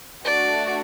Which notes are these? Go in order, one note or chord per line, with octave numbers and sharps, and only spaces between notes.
A3 D4 F#4 D5